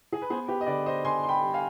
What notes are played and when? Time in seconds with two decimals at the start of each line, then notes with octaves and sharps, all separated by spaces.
0.12 G#4
0.22 B4
0.30 B3 G#4 C5
0.48 G4 B4
0.61 D#5
0.66 D3 B4 D5
0.86 C5 D#5
1.04 D3 G#5 C6
1.23 C6
1.29 G5 B5
1.41 G3
1.53 F5 G#5